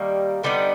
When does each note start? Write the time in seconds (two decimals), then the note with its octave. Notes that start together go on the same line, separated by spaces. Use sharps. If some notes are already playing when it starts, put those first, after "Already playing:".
Already playing: D#3 G3 A#3
0.44 D3 G3 B3 D#4